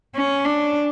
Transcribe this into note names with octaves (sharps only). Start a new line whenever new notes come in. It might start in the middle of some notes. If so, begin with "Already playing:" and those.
C#4
D4